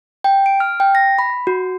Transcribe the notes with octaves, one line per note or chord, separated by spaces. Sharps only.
G5
D7
F6
G5
A#6
B5
F#4